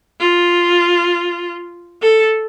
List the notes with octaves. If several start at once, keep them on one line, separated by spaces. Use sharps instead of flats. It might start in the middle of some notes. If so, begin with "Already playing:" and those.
F4
A4